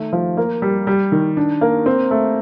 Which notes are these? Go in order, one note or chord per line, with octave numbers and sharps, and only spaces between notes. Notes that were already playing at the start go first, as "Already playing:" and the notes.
Already playing: D#3 A3
F3
A#3
G3
G3
D#3
D4
A#3
C4
A3